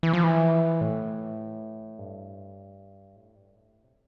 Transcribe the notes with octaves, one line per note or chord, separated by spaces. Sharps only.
E3
F3
E3
A2
G2
A2
G2
A2
C3